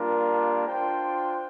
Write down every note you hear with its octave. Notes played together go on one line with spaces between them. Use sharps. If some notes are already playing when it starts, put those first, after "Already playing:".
Already playing: G3 A#3 D4 F4 A#4
D4 F4 C5 G5